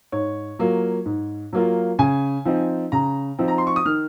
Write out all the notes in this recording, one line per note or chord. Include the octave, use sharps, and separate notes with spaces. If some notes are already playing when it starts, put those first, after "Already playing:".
G#2 C#5
F#3 A#3 F4
G#2
F#3 A#3 F4
C#3 G#5
F3 C4 D#4
C#3 A#5
F3 C4 D#4
A#5
C6
C#6
D#6
D#3 F6